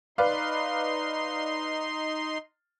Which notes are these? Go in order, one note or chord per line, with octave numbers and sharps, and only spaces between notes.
D#4 B4 D5 F5 C6